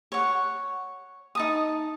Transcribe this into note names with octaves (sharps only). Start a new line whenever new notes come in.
C#5 F#5
D#4 A5 D#6